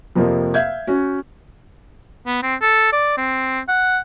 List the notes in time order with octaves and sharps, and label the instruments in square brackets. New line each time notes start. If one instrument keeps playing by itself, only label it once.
[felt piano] F2 C3 F3 A#3
E5 F5 G6 G#6
C#4 F#4
[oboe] B3
C4
A4
D5
C4
F#5